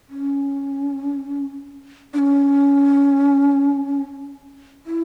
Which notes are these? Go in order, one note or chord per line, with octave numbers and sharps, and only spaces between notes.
C#4
D4
C#4
E4